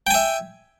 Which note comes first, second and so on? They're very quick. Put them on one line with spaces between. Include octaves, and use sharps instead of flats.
G5 G#5 E5